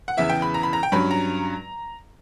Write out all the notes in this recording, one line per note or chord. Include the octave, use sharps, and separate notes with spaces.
F#5
E2 C#3 E3 B3 E4 E5
G5
B5
A#5
B5
A#5
G5
G2 F#3 C#4 B5
A#5